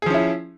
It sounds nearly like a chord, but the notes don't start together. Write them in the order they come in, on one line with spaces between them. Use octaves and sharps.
G#4 F3 C#4 E4